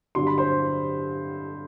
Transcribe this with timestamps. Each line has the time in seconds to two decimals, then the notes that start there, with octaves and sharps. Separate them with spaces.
0.15 G2 D3 F#3 C6
0.27 B5
0.38 C5 C6